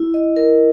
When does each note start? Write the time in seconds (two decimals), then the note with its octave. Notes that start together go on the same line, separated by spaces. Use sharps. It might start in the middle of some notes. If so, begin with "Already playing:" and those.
Already playing: E4
0.14 D#5
0.36 A#4